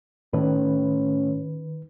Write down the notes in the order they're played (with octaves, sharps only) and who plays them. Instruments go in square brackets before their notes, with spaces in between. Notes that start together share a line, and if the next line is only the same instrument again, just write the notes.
[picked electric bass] A2 [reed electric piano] D#3 B4 [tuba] C#4